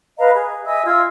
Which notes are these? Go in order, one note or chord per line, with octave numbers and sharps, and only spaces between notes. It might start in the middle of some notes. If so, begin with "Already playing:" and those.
B4 D#5 F5 A#5
G#4
D#5 E5 G#5 E6
F4 E6 G#6